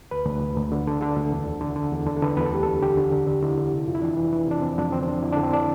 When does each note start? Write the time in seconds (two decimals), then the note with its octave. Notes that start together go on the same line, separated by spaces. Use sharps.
0.11 D2 B4
0.26 D2
0.41 D3
0.56 D2
0.72 D3
0.87 D3
1.01 D3 A4
1.17 D2
1.32 E2
1.47 D3
1.61 D3
1.76 D3
1.92 E2
2.07 D3
2.16 A4
2.22 D3 B4
2.37 E2 B4
2.45 A4
2.51 D2 G4
2.63 D3 A4
2.82 D3 G4
2.98 D3
3.12 D3
3.27 D3
3.42 D3 E4
3.58 D3
3.72 C3
3.87 F2 F4
3.95 E4
4.02 E3 D4
4.17 E3
4.33 E3
4.47 C3 D4
4.62 F2 C4
4.78 F2 D4
4.92 D3 C4
5.03 C4
5.07 F2 D4
5.22 D3 E4
5.33 D4
5.37 D3
5.43 C4
5.53 D4